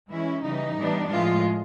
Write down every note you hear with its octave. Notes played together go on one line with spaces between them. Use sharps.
E3 G#3 C#4 E4
C#3 E3 G3 D#4
A2 E3 G3 B3 D4
A2 F3 G#3 F4